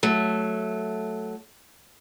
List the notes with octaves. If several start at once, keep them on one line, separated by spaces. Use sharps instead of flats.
F#3 A3